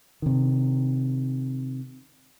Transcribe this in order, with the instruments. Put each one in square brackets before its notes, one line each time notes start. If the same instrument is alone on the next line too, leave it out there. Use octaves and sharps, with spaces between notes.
[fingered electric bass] C3 D#3